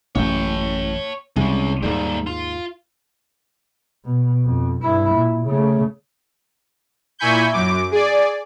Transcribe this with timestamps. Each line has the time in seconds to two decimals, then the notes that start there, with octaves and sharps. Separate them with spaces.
0.15 A1 F#2 C#5 G5
1.36 C2 G#3 C#4
1.82 D#2 G#2 G3 A#3
2.27 F4
4.05 B2
4.45 F2
4.82 G2 E4
5.14 A#2
5.47 C#3 A3
7.19 A#2 E4 G#5 B5 C#6 G6
7.53 F#2 D6
7.91 G#4 D5